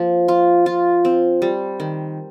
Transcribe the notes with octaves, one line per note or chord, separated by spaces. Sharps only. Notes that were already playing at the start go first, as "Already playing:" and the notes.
Already playing: F3 A#3
F4
F4
C4
G3
D#3